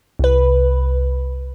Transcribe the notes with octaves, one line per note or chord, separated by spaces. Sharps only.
C2 B4